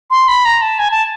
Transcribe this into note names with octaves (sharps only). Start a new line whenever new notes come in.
C6
B5
A#5
A5
G#5
A5